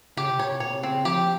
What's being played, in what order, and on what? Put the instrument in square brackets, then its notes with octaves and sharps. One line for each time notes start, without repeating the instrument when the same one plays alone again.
[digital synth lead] C#3 [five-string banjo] G4
[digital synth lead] C3
[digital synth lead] A#2 [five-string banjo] C#5
[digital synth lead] C3
[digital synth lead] A#2 [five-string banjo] C#5
[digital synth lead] C3
[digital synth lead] C#3 [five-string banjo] C4
[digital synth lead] C#3
[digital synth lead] F3 [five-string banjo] G4